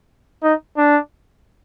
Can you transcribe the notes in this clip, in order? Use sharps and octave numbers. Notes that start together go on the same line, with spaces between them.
D#4
D4